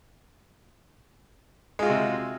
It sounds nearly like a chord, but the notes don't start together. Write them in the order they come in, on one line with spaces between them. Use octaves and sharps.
G#3 F4 F#4 C3